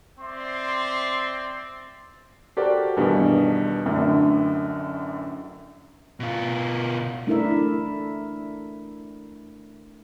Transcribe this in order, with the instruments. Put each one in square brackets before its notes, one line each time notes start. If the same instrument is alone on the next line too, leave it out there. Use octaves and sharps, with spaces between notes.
[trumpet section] C4 D5 E5 C6
[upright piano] F#4 G4 A4 A#4 C5 D5
E2 G2 B2 D#3
A1 F#2 A2 D3
[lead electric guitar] B2 F4
[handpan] A3 D4 E4 A#4 E5